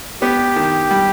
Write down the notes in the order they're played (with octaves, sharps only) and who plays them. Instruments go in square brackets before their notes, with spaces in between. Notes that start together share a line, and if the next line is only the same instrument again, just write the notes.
[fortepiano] B3 [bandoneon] G4
[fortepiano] D#3
G3